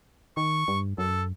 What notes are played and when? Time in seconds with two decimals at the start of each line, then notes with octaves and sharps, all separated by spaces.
0.37 D#3 C#6
0.68 G2
0.98 F#2 A4